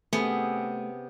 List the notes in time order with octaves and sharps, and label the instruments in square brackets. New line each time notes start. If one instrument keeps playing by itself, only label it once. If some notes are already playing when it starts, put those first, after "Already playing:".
[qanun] C3 C#4 G#4 [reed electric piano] A3 [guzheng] B3